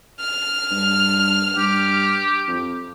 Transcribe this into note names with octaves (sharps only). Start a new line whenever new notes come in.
F6
G2
G2 G4
F2